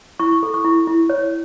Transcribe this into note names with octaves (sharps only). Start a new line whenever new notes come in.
E4 C#6
A4
C#6
E4
E4
C#5